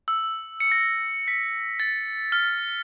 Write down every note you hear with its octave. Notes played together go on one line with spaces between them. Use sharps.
E6
C#7
A#6
B6
A6
F6